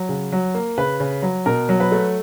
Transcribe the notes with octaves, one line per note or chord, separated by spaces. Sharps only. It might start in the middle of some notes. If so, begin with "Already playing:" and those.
Already playing: F#3
C#3
F#3
A#3
C#3 B4
C#3
F#3
B2 A#4
F#3
B4
A3